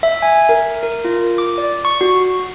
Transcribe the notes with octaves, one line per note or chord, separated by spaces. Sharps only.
E5
G#5
A#4
A#4
F4
D6
D5
C#6
F#4